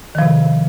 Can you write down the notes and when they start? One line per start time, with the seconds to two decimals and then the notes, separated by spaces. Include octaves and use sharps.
0.15 D#3
0.18 F3
0.22 C3